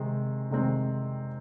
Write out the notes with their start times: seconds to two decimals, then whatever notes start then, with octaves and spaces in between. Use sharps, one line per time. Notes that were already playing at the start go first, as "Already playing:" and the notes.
Already playing: C3 D#3 G#3 C4
0.50 C3 D#3 G#3 C4